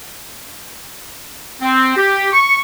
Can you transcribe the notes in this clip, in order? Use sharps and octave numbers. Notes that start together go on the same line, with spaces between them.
C4
G4
C#6